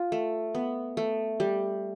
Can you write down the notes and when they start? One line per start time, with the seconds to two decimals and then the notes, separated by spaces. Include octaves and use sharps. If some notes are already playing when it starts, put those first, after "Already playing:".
Already playing: F4
0.12 A3
0.55 B3
0.97 A3
1.40 G3